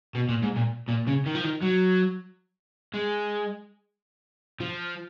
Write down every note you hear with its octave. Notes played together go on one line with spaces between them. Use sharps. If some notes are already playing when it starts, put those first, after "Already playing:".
B2
A#2
G#2
A#2
A#2
C#3
D#3
F3
D#3
F#3
G#3
F3